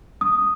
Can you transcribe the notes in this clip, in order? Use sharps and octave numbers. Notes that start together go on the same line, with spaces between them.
D#6